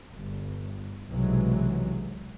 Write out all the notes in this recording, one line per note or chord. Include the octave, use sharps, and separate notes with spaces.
G1
B1 C3 E3 F#3 G#3